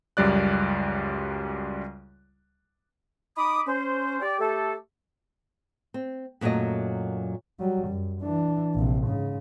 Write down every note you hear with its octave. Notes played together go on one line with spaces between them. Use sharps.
C#2 F#2 G3 D5 F#6
D#4 B5 D6 D#6
C#4 C5
G4 D5
A3 G4 A4
C4
F#2 A#2 F#3 A3 D#5
F#3 G3
F#2
E3 D4
A#1 C3
G#2 C#3